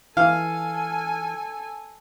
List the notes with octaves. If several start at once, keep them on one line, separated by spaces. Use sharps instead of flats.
E3 A4 F5 G#5